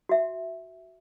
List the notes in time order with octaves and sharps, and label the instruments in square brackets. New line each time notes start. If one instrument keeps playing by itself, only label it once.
[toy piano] F#4 E5